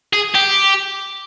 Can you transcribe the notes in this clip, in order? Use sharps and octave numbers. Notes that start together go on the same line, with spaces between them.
G#4
G4